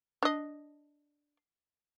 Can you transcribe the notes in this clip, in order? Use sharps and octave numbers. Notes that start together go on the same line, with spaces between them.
D4 D#5